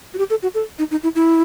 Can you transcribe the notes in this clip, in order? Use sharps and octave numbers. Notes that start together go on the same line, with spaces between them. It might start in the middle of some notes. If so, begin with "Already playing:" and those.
F#4
G4
A4
F#4
A4
D#4
D#4
E4
E4